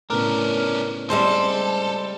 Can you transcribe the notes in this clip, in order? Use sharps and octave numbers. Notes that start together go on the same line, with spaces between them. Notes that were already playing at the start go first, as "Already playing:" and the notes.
A2 C#3 B3 C#4 D4 A#4
G3 G#3 C4 A4 C5